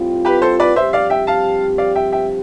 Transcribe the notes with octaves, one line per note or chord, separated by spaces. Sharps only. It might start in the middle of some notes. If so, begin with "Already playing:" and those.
Already playing: A2 G3 C4 F4
G4 B4
A4 C5
B4 D5
G2 F3 C4 G4 C5 E5
D5 F5
E5 G5
F5 A5
D5 F5
E5 G5
E5 G5